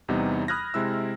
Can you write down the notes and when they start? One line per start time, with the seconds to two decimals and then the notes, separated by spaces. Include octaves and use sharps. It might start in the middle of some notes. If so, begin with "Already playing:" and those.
0.08 E2 C3 G3 B3 D#4
0.48 B5 D#6 F6 F#6 G#6 A#6
0.74 C3 G#3 E4 E6